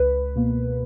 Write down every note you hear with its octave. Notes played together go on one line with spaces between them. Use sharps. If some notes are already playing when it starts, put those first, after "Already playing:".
Already playing: C#2 B4
B2 A#3